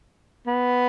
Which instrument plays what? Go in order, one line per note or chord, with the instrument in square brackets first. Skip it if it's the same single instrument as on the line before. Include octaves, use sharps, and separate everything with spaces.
[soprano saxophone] B3